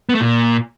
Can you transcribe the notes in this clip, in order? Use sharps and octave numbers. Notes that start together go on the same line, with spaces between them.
B3
A3
A#2